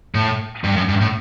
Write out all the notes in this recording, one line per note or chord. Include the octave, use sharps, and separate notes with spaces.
A2
G2
F#2
G2
A2